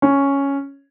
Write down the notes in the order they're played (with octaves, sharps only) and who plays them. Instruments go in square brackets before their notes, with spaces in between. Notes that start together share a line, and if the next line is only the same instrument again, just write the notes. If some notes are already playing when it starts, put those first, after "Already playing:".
[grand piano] C#4